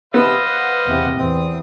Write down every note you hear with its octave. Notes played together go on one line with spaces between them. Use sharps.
C3 B3 C5 D#5 F5 E6
B4 F#5
E2 C3
E2 C4 D#6